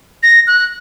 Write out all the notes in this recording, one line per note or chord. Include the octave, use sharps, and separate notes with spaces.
A#6
F#6